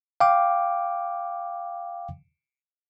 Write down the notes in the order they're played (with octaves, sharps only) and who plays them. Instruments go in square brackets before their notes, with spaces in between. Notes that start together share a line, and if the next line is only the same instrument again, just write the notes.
[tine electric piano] F5 G5 D6